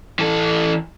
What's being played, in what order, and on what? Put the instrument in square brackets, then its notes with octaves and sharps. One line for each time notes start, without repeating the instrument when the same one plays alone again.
[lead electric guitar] E3 A4